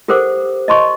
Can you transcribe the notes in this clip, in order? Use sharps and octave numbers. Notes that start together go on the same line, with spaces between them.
G4 A4 A#4 C5 F#5 D6
D#5 A5 C6 C#6